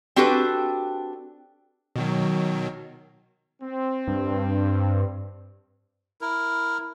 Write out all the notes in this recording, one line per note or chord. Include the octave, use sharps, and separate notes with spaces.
C4 D4 F#4 G4 A4 B4
B2 D#3 F#3
C4
G2
E4 A#4